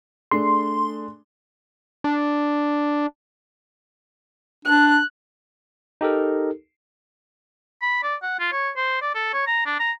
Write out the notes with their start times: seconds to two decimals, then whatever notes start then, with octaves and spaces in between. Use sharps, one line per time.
0.31 A3 D4 G#4 C6
2.04 D4
4.65 D4 F#6
6.01 D#4 G4 A4 A#4
7.82 B5
8.03 D5
8.23 F#5
8.40 F4
8.52 C#5
8.77 C5
9.02 D5
9.15 A4
9.34 C#5
9.47 A#5
9.66 D4
9.79 A#5